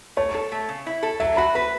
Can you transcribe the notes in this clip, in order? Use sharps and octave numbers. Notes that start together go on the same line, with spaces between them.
A3 C#5
A4
A3
C#3
E4
A4
F#3 E5
F#4 B5
B4 B5